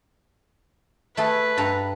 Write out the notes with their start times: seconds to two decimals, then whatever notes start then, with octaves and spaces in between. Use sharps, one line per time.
1.17 A3 G#4 A4 B4
1.57 G2 A4 A#5